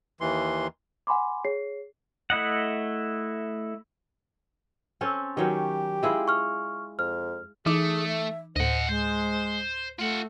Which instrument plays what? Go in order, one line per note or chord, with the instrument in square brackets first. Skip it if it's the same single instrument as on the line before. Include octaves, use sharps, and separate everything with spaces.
[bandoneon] D#2 E3 C6
[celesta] F#5 G#5 B5 C6 D6
G#4 C#5 C7
[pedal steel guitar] A3 E4 D#5 F#5
[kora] C4 C#4 A4
[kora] D#3 F#3 C#4 [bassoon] G4
[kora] G#3 E4 F4
[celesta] C#6 F6
[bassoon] F2 [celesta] F6
[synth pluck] E3 D#4 D6 [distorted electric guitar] A3 [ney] G#4
[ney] E5
[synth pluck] D2 A2 [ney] C5 [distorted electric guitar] D#5 F#5
[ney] G#3 [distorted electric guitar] C5
[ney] A3 [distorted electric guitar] F4 F#5